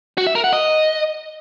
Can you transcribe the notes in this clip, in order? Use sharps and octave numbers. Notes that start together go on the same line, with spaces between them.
F#4
E5
A#4
F#5
D#5